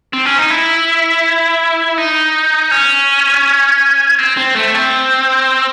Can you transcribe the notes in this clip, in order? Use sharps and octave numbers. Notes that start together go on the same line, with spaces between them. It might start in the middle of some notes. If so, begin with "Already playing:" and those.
C4
C#4
D#4
E4
D#4
C#4
C4
C4
A3
C4